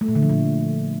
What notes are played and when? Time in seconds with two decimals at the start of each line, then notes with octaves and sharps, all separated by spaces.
0.01 A3
0.08 A#2
0.15 D3
0.22 F3
0.30 A#2